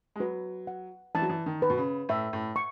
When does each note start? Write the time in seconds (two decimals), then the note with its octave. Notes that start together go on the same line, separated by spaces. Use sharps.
0.16 G#3
0.20 F#3 B4
0.67 F#5
1.15 E3 A5
1.22 F#3
1.29 E3
1.46 D#3
1.62 B4
1.70 B2
1.78 C#3
2.09 A2 E5
2.33 A2
2.56 C#6